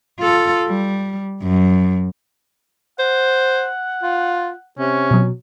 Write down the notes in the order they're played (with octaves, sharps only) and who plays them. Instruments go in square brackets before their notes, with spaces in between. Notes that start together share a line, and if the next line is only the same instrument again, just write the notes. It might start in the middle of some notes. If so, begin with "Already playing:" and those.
[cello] F4 A4
G3
F#2
[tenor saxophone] C5 [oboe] F#5
[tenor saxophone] F4
[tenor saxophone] C3 [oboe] C#4
[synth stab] B2 F#3